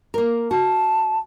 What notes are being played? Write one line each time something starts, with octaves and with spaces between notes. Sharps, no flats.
A#3 A#4
F#4 A5